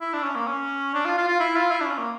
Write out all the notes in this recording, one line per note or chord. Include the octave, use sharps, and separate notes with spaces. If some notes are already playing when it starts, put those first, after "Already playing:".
E4
D4
C#4
A#3
C#4
D4
F4
F4
F4
E4
F4
E4
D4
C#4
A#3